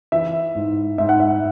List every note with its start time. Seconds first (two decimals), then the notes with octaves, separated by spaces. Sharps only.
0.12 E3 E5
0.55 G#2
0.98 G#2 E5
1.09 F#5
1.20 E5